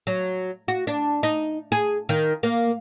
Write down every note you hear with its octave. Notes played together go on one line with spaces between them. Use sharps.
F#3
F#4
D4
D#4
G#4
D#3
A#3